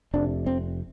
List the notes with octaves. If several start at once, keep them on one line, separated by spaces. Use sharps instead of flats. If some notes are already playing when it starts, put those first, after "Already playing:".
F1 F2 C3 D4
C4